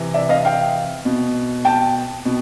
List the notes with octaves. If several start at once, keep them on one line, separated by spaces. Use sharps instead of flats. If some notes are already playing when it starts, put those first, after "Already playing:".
Already playing: C3 E3
D5 E5
D#5 F5
F5 G5
B2
G5 A5
B2